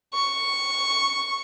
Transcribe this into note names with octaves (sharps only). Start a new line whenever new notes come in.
C#6